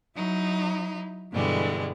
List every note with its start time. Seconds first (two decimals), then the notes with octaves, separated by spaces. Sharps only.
0.16 F#3 D#4 E4
1.32 G2 B2 D3 E3 G3 G#3